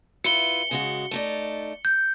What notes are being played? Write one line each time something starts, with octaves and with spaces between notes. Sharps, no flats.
E4 F4 B4 C#7 G7
C#3 G#3 F#4
A3 D#4 D5
G6